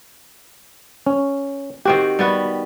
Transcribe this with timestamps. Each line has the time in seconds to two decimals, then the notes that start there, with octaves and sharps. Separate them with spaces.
1.06 C#4
1.85 D#3 C4 F#4 G4
2.19 G3 B3 F#4